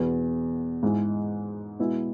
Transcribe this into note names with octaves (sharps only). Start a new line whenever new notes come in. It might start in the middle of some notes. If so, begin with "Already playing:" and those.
Already playing: E2 B2 B3
G#2 G#3 E4
B2 G#3 B3 E4